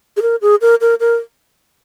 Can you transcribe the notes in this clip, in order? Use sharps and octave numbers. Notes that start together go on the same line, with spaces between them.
G#4
A#4
G#4
A#4
A#4
A#4